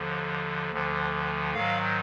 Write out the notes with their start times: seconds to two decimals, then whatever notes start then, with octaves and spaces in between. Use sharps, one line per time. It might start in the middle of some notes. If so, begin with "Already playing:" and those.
Already playing: D#2 D3 F3
0.72 D2 D3 F3
1.53 G#2 D#3 F#3 F5